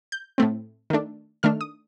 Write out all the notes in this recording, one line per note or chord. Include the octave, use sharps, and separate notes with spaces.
G6
A2 A3 C4
D#3 A3 D4
D#3 A3 D4 F6
D#6